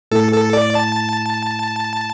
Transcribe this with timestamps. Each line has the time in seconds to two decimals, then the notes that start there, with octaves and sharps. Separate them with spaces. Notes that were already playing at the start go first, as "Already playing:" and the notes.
0.11 A2 A3 E4 A4
0.33 A4
0.53 D5
0.75 A5